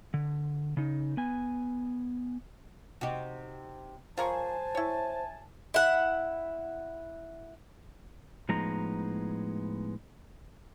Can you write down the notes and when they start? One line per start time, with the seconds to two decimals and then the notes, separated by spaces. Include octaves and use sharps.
0.14 D3
0.77 C#3 D#4
1.17 B3 G#5
3.01 C3 D#4 F#4 G4
4.18 F#2 F4 G#4 A#4 C5 G#5 A5 C#6
4.75 E4 C#5
5.74 E4 F#5
8.49 A2 F3 G#3 B3 D#4 A#5